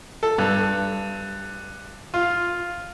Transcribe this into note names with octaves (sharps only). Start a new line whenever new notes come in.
A4
G2
F4